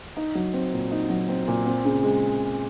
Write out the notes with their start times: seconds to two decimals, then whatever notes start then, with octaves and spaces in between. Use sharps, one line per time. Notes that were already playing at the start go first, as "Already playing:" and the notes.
0.17 D#4
0.35 F#3
0.53 C4
0.73 A#2
0.91 D#4
1.10 F#3
1.29 C4
1.48 A#2
1.66 C4
1.85 C#3
2.03 G#3